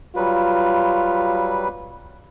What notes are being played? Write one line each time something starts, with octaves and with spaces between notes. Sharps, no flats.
F#3 G3 F4 B4